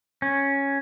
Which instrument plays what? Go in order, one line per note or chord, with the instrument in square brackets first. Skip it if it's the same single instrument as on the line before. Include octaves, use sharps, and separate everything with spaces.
[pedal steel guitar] C#4